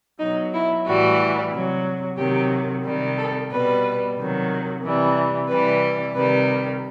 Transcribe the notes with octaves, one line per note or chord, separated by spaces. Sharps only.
B2 F#3 D#4
E4
A2 E3 G3 F#4
C3 F#3
C3 D#3 F#3 G4
C3 D#3 G3
A4
B2 G3 B4
C3 D#3 F#3
C3 E3 G3
C3 E3 G3 B4
C3 D#3 G3 B4